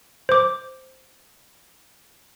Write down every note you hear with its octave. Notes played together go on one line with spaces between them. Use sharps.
C5 D6